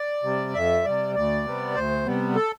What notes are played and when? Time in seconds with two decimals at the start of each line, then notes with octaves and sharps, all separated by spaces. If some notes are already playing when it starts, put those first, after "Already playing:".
Already playing: D5
0.23 C3 G3
0.54 F2 E5
0.85 C3 G3 D5
1.15 D2 D5
1.45 C3 G3 B3
1.75 D2 C5
2.06 C3 G3 B3
2.36 A4